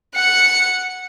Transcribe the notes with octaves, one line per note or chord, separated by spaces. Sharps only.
F#5 C#7